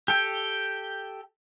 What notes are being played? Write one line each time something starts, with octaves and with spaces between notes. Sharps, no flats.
G4 A4 G5